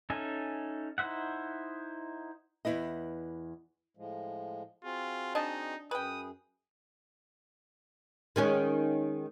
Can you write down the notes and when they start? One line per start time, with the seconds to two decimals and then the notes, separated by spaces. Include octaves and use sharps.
0.10 C#4 D#4 A4 E5 G#5
0.98 D#4 E4 C5 E5 F#5
2.65 E2 B2 E4 B4 D#5
3.97 A2 F3 G#3
4.84 C4 F4 F#4 G#4
5.35 D4 D#4 D#5 A5
5.91 F#2 G#4 B4 G5 D#6
8.36 D#3 G#3 C#4